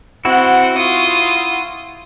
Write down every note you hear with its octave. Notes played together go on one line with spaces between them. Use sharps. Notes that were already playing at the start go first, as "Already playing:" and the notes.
C4 E4 F#4 F#5
F4 D#6